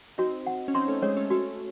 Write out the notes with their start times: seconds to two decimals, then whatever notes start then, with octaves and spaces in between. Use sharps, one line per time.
0.18 C4 D#4 F#4
0.47 F#5
0.68 C#4
0.74 C4 D#4 C6
0.88 A3 C#4
1.02 G#3 C4 C#5
1.17 A3 C#4
1.30 A3 C#4 F#4